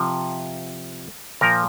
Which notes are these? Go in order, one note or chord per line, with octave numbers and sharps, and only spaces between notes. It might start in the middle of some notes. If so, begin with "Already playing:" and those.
Already playing: C3 F3
A#2 F3 A#4